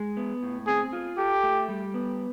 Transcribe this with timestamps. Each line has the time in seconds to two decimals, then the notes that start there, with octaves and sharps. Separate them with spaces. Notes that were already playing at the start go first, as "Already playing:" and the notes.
Already playing: G#3
0.17 B3
0.43 A2
0.67 C4 G#4
0.93 F4
1.18 G4 A4
1.43 A3
1.68 G3
1.94 B3